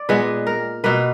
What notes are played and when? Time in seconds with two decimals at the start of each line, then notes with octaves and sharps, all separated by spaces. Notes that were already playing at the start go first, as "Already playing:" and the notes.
Already playing: D5
0.09 A#2 G#3 B3 B4
0.47 A#4
0.84 B2 A#3 B4